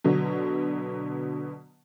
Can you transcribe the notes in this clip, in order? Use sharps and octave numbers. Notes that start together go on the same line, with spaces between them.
B2 D3 F#3